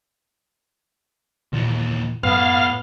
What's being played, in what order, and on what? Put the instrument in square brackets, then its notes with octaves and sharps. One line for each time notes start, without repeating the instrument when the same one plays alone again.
[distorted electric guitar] D#2 E3 [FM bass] A#2
[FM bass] F#2 [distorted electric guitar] A2 [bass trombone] B3 [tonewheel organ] F5